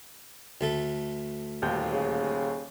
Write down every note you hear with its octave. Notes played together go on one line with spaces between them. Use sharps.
D2 A3 A4
D#1 D#2 G6
C#3